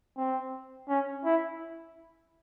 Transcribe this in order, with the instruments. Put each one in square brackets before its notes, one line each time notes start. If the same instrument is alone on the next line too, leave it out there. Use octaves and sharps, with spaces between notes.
[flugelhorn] C4
C#4
E4